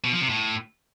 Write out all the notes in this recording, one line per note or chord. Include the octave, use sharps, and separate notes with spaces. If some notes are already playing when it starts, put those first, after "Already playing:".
B2
F3
C3
A2